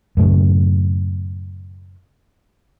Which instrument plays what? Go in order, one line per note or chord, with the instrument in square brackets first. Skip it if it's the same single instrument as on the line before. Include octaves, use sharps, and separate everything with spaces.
[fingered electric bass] F#2 A2 C#3